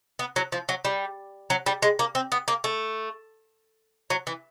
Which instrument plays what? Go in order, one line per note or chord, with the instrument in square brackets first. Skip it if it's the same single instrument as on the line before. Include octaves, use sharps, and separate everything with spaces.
[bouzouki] B3
F#3
F3
F#3
G3
F#3
G3
G#3
A#3
C4
B3
A#3
A3
F#3
E3